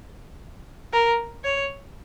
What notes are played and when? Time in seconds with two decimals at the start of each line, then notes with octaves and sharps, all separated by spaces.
0.93 A#4
1.44 C#5